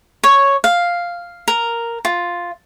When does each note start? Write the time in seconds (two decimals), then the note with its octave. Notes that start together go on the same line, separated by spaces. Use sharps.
0.24 C#5
0.64 F5
1.48 A#4
2.05 F4